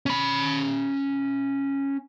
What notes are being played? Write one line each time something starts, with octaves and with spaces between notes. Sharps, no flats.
C#4 B5